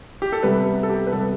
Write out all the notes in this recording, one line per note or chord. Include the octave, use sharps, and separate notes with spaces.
G4
A4
C3 G3 B3 B4
A4
G4
B4
C3 G3 B3 A4